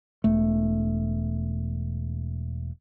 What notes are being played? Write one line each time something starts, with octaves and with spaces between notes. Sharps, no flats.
E1 A3